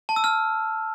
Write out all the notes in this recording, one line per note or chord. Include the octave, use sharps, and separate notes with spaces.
A5
E6
F6